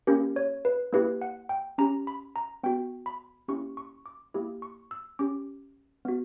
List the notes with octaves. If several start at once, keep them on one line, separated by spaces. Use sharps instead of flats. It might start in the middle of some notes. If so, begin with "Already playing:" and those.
A#3 C#4 G4 A#4
C#5
B4
A#3 E4 G4 B4
F#5
G5
C#4 G4 A#5
B5
A#5
B3 F#4 G5
B5
A#3 C#4 E4 G4 C#6
C#6
D6
A#3 E4 G4 D6
C#6
E6
C#4 G4 D6
B3 F#4